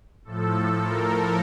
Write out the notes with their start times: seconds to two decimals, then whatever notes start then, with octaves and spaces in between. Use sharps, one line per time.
0.25 A2 F3 A4
0.79 A#4